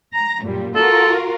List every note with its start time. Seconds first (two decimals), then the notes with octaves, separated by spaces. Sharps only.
0.13 A#5
0.43 F#2 A#2 G3
0.75 F4 F#4 A4 A#4